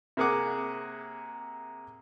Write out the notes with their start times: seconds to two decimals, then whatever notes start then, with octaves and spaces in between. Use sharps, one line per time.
0.17 C3 A#3 G#4 F#5 D6